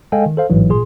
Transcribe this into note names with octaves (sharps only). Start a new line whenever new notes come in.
G#3 A4 D#5 F5 G5 G#5
D#3
A4 C5 F5
A1 G#2 E3 F#3
A#2 G#4 C6